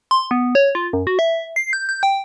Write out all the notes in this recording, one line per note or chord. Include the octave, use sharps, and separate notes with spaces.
C6
B3
C#5
F4
F#2
F#4
E5
C7
G6
G6
G5